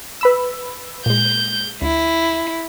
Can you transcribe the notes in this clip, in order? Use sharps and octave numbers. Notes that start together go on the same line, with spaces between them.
B4 B5 E6
A#2 G#3 G6
D2 E4